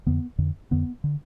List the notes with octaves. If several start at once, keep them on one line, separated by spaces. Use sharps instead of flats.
F2 D3 B3
F2 D3
F2 D3 B3
D3